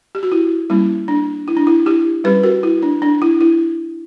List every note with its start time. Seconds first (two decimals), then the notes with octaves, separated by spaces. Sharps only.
0.15 G4
0.23 F#4
0.32 E4
0.70 G3 A#3 C#4 E4
1.08 D4
1.48 E4
1.57 D4
1.67 E4
1.86 E4 G4
2.24 G3 C#4 G4 B4
2.43 F#4 A#4
2.63 E4
2.83 D4
3.02 D4
3.22 E4
3.41 E4